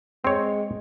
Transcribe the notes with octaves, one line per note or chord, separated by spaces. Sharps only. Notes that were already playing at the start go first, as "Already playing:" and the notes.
G#3 C4 C#5